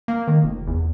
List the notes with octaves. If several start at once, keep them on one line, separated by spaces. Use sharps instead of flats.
A#3
D#3
F1
E2